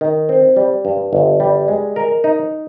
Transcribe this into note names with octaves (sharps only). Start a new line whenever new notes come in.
D#3
C4
G3
G2
G1
G3
G#3
A#4
D#4